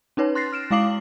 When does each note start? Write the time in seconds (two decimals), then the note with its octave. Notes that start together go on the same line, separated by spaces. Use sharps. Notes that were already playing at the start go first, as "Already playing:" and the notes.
0.17 C#4 D#4 B4 C#5
0.35 C6 F#6 A6 A#6 C7
0.52 F6 D7 E7
0.71 G#3 E4 F5 D6 C7 F#7